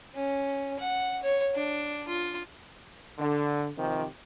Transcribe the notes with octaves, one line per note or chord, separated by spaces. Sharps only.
C#4
F#5
C#5
D4
F4
D3
C3 D#3 F3 G4